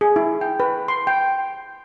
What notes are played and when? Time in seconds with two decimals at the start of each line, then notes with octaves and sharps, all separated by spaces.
0.01 G#4
0.16 E4
0.41 G5
0.60 B4
0.88 C6
1.07 G5